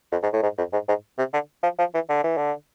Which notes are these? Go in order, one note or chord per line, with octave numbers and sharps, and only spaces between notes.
F2
G#2
A2
G#2
F2
G#2
G#2
C3
D3
F3
F3
E3
D3
E3
D3